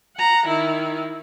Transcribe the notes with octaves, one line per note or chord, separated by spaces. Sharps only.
F#5 A#5
D#3 E4